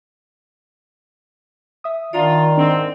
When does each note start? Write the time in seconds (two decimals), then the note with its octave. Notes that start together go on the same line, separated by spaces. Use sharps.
1.84 E5 D#6
2.13 D#3 D4 F4 D5 A#5
2.57 G#2 C4 D4